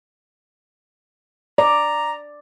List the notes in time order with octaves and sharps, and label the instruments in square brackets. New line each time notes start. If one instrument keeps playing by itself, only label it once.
[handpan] D5 [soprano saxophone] A#5